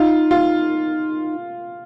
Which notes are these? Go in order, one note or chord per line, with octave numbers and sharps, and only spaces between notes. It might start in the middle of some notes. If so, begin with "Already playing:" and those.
Already playing: D#4 F4
F4